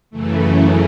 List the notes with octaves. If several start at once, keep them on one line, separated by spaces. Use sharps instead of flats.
F#2 C#3 E3 A3